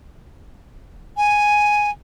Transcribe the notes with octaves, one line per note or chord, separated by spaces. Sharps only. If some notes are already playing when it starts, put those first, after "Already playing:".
G#5